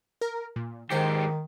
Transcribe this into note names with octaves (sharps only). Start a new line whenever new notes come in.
A#4
A#2
G#2 D#3 G4 C5 C7 C#7